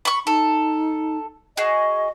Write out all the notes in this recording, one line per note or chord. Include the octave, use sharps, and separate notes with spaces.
B5 C#6
D#4 A4
F#4 G#4 D#5